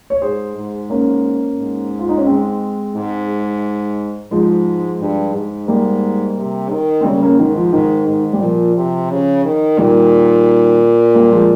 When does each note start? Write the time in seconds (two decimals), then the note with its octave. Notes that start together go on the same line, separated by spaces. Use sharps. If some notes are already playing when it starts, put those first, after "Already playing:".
0.10 C#5
0.21 G#2 G#4 C5
0.56 G#2
0.90 A#3 C#4
1.58 G#2
1.99 F4
2.09 D#4
2.17 C#4
2.26 G#3 C4
2.95 G#2
4.31 G#2 F3 G#3
5.01 G2
5.34 G#2
5.68 G#2 G3 A#3
6.37 C3
6.70 D#3
7.01 C4
7.04 C#3 G3 A#3
7.22 A#3 C#4
7.39 G#2 D#3
7.56 F3
7.73 G#2 D#3
8.07 G#2
8.33 G3
8.41 A#2 F3
8.76 C3
9.10 C#3
9.44 D#3
9.78 A#2 D#3 G3
11.14 G3 A#3
11.31 F3 G#3